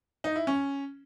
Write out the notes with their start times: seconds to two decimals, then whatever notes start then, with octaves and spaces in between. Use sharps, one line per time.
0.24 D#4
0.36 E4
0.47 C#4